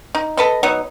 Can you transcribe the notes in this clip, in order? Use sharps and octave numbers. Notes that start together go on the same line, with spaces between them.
D#4
A4 B4 D#5
F#3 B3 D#4